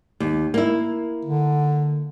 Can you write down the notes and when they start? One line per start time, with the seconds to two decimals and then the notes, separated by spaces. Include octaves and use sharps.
0.20 D#2
0.54 A#3 E4
1.25 D3